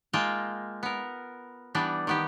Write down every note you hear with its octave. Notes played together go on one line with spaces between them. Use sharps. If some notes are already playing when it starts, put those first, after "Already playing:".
G#3 A#3 F4 G5 A5
B3 A#4
E3 G3 B3 D4
D#3 B3 G4